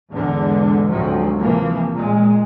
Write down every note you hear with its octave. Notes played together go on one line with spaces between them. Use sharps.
E2 G#2 D3 G#3
D2 G#2 C3 F3 F#3
C3 E3 F3 A#3
A#2 G#3